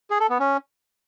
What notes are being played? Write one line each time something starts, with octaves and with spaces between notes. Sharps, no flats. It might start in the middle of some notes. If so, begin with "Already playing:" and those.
G#4
A4
B3
C#4